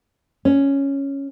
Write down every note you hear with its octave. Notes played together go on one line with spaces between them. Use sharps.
C#4